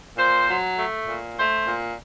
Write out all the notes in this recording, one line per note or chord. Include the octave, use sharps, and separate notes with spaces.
A#2 C5
F#3
A3
A#2
A3 C5
A#2